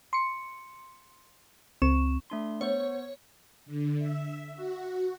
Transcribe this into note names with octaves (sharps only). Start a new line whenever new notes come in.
C6 C#7
C#2 C4 C#6 E7
A3 D4 C6
B3 C5 C#5
D3
E5
F#4